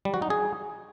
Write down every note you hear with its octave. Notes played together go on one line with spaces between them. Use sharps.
G3
F#4
D#4
G#4